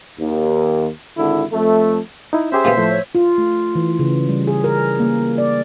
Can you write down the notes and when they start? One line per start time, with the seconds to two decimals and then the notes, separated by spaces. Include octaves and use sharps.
0.18 D#2
1.17 G#1 D3 E4
1.51 F2 A3
2.33 D#4 E4
2.52 C#4 G4 G#4 C5 E5 C6
2.65 A#2 C#3 B3
2.77 A2 F3 A3
2.90 C#5
3.15 F4
3.38 A3
3.75 E3
3.99 C#3
4.29 G3
4.47 G#4
4.64 A#4
4.99 A#3
5.38 D5